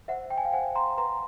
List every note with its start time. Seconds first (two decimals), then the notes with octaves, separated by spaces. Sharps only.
0.08 C5 E5 F#5
0.30 G5
0.38 G#5
0.44 F5 G5
0.53 C5 F#5 G#5
0.75 A#5 C6
0.97 B4 A#5 C6